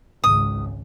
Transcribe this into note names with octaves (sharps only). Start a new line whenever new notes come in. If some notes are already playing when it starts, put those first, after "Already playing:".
G#1 C#2 D#6